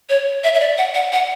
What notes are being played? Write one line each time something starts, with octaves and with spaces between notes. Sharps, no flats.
C#5
E5
E5
D5
F#5
F#5
F#5